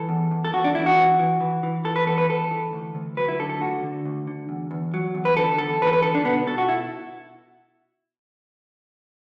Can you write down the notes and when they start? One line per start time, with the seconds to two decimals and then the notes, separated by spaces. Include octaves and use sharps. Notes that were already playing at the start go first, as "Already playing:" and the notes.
Already playing: E3 A4
0.09 E2
0.31 E2
0.45 A4
0.53 E2 F#4
0.64 D4
0.75 E2 E4
0.86 F#4
0.97 E3
1.19 E3
1.41 E3
1.63 E3
1.85 E3 A4
1.96 B4
2.07 E2 A4
2.18 B4
2.29 E2 A4
2.51 E3
2.73 D2
2.95 D2
3.17 F#3 B4
3.28 E4
3.39 D3 A4
3.50 A4
3.61 D2 F#4
3.83 D3
4.05 D2
4.27 D3
4.49 E2
4.71 E2
4.94 F#3
5.15 E2
5.25 B4
5.37 D3 A4
5.58 E2 A4
5.81 E2 B4
5.87 A4
5.93 B4
6.02 D3 A4
6.15 D4
6.24 B2 B3
6.47 B2 A4
6.58 F#4
6.69 E4